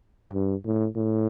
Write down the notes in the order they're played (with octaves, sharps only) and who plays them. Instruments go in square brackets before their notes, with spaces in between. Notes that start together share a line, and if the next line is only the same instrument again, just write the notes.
[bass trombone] G2
A2
A2